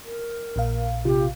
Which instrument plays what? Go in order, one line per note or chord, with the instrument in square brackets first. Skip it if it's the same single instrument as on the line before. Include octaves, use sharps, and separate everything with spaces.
[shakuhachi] A#4
[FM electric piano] A#1 A#2 F5
[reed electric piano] C3 F4 [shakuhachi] G4